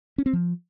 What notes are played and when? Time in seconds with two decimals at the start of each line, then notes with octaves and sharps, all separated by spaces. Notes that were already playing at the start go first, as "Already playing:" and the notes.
0.18 C#4
0.26 C4
0.33 F3